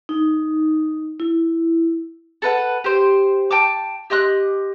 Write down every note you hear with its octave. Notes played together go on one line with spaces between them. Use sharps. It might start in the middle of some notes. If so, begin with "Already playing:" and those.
D#4
E4
A4 B4 F#5
G4 C5
G5 A5 D6
G4 D#5 C6 F#6